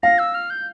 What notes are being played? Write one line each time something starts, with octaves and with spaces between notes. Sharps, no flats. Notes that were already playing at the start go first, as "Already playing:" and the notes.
F5 A#6
E6
F6
G6